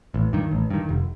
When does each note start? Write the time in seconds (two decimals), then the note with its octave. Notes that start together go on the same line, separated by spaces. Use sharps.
0.14 A1
0.33 G2 D#3
0.51 A1
0.70 G2 D#3
0.89 F1